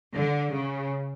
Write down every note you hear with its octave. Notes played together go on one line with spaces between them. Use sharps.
D3
C#3